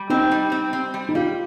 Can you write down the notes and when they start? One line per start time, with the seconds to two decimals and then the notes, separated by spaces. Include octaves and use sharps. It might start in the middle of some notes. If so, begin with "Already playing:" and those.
Already playing: G3
0.09 C4 D#4
0.31 G3
0.52 C4
0.73 C4
0.94 G3
1.09 D#4
1.15 G3 F4